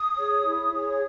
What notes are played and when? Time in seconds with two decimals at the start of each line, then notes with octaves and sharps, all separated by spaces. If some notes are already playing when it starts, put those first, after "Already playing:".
Already playing: D#6
0.16 G#4 C#5
0.44 E4
0.72 G#4 C#5